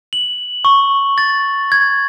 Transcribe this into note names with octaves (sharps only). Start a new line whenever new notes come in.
F#7
C#6
A6
G#6